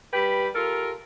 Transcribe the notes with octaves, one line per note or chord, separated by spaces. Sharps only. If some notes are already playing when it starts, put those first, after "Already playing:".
G3 G4 B4 G5 B5
F4 G4 A4 A#4